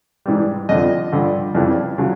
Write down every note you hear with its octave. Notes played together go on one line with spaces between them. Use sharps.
G#2 E3 G3
F2 D3 F3 D#5
G2 D3 F3
F2 C#3 E3 G3
C#3 F#3